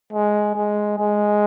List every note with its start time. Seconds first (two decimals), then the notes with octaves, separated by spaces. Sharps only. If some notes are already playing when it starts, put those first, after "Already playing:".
0.13 G#3
0.55 G#3
0.98 G#3